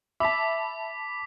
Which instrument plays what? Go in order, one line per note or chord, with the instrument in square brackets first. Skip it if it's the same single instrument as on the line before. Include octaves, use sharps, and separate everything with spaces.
[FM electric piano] E5 [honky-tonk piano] A5 B5 [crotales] D6 B6